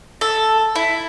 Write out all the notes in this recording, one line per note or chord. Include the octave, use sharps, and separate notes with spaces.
A4
E4